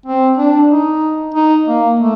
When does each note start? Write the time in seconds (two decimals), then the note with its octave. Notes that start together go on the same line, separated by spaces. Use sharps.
0.06 C4
0.37 D4
0.71 D#4
1.35 D#4
1.68 A#3
2.00 A3